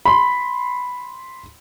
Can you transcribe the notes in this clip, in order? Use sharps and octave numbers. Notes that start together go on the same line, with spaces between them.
B5 C6